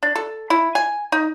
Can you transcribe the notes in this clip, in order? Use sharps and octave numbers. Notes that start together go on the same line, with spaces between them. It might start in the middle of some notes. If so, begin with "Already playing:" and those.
D4
A4
E4
G#5
D#4